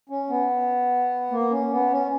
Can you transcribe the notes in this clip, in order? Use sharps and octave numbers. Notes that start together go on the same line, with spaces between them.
C#4
B3
A#3
C#4
B3
C#4